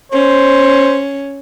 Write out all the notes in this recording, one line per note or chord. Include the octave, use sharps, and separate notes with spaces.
C#4 C5